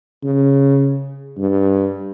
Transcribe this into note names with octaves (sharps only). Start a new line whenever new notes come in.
C#3
G2